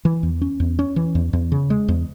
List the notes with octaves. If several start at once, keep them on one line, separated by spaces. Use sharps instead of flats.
E3
E2
C#4
E2
C#4
E3
E2
E2
C#3
G#3
E2